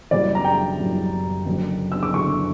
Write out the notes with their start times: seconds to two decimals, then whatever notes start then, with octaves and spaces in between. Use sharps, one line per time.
0.11 F#1 F#2 E3 G3 D5
0.35 A#5
0.45 G5
0.78 F#1 F#2 E3 G3
1.46 F#1 F#2 D3
1.92 E6
2.03 D6
2.13 F#1 F#2 D3 C#6